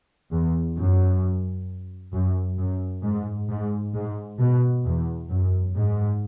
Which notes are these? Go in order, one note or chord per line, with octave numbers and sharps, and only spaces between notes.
E2
F#2
F#2
F#2
G#2
G#2
G#2
B2
E2
F#2
G#2